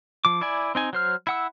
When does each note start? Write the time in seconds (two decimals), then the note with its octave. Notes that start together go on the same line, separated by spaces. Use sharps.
0.25 F3 D6
0.41 E4 D5 G#5
0.75 C4 D#4 G#5
0.93 F#3 C5 F6
1.27 E4 F#5 E6